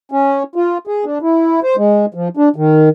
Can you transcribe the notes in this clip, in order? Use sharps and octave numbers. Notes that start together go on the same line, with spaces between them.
C#4
F4
G#4
D4
E4
C5
G#3
F3
D4
D#3